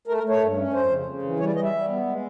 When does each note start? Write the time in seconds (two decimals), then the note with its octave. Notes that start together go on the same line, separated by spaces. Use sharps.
0.08 A3 A#4
0.18 A#4
0.23 A3
0.30 C#5
0.40 G2
0.57 C#4
0.73 F2 C5
0.90 C#3
1.06 C#3
1.22 E3
1.39 G3 C#5
1.47 D5
1.55 G3 D#5
1.64 E5
1.72 G3
1.88 B3
2.06 G#3